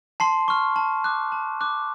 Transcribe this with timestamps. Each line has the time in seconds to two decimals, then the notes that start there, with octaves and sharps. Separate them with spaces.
0.20 A5 C6 C7
0.48 C#6 F6
0.76 A5
1.04 D6 F#6
1.32 A5
1.61 D6 F#6